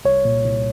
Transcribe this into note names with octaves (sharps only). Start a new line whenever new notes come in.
C2 C#5
A#2
C2